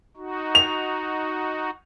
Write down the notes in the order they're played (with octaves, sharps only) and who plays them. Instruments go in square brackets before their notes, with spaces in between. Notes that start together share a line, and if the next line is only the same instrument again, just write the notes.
[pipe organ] D#4 F#4
[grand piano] F7